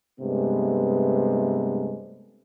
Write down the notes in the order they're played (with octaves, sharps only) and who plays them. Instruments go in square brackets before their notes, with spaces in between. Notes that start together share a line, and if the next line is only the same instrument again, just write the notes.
[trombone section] G2 C3 G#3 A3 B3